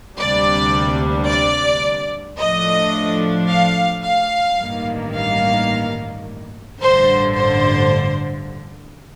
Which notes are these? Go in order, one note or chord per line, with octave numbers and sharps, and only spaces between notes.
D2 C3 G3 A#3 D4 D5
D5
A2 F3 A3 D4 D#5
F5
F5
A1 G2 D#3 A#3
F5
A1 G2 D3 C5
C5